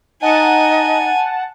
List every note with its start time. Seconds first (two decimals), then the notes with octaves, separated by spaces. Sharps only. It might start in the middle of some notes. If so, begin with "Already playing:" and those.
0.22 D#4 D#5 F#5 G#5 A5